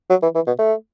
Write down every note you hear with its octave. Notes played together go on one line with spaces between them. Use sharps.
F#3
E3
E3
B2
A3